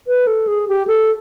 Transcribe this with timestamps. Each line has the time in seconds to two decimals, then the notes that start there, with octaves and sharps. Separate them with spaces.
0.07 B4
0.27 A4
0.47 G#4
0.68 G4
0.87 A4